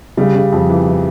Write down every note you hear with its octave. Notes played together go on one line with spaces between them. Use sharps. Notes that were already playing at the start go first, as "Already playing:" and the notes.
C#3 G3
C#3
F2
E3
E3